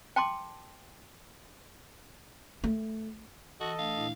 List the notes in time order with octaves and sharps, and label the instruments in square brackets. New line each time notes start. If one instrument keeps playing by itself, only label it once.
[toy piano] G5 A5 C6 D6
[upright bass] A3
[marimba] E3 [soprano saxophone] F#4 [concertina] A4 D#5
[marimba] A3 D4 [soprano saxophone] F5
[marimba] A#2 D4 E4